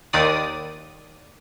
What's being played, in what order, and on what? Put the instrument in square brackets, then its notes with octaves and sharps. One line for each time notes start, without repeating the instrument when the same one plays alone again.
[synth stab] D#2 D#3 D5 D#6